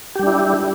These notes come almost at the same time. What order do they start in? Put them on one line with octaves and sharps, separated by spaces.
G4 G3 D4 E4